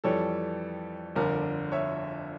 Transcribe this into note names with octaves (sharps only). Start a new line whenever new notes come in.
F2 E3 G3 A4 C#5
G1 F2 D3 A#4 D5
C#5 E5